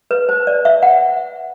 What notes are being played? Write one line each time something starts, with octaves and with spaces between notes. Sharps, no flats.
B4
C5
D5
E5
F#5